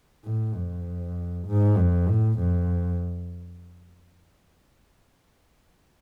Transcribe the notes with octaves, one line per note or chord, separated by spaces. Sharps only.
A2
F2
G#2
F2
A2
F2